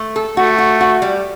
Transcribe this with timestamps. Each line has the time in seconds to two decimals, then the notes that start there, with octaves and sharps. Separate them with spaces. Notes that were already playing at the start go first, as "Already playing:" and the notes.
Already playing: A3
0.16 A4
0.37 A3 F#4
0.58 F#4
0.81 F#4
1.02 G3